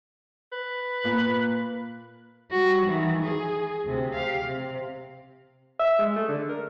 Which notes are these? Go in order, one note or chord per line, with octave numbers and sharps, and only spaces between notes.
B4
A#2 A#3
G3 F#4
D#3 E3
G#4
D2 C3
G4 F5
C3
E5
G#3
A3
D3
A#4